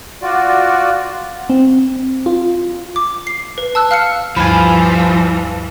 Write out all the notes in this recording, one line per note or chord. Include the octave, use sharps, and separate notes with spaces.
F4 F#4 D5
C4
F4
D6
C7
B4
A5 E6 F#6
F5 F6 C7 C#7
D2 G2 E3 F3 G3 B4 F5 G#5